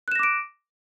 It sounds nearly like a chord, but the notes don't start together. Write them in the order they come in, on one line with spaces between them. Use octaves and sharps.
F#6 E7 A#6 D6 D7